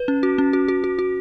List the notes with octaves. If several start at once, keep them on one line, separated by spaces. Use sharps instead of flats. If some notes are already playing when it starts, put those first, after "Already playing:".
Already playing: B4
C#4
F#4
C#4
F#4
F#4
F#4
F#4